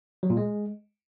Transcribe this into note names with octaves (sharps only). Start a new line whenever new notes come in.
F#3
A#2
G#3